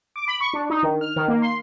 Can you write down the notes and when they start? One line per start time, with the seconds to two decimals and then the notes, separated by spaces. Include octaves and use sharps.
0.16 D6
0.28 B5
0.41 C#6
0.53 D4
0.70 D#4
0.83 D#3
1.01 F6
1.16 D#3
1.28 A#3
1.42 C6